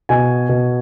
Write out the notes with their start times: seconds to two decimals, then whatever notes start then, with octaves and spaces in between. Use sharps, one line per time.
0.09 B2 G#5
0.49 B2